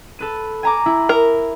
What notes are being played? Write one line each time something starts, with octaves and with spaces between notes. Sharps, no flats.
A4 B4 D#7
G#5 A#5 D6
E4
A#4